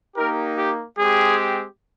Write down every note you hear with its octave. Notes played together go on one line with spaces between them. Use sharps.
A#3 D#4 G4 A#4
G4
G#3 C4 G4 G#4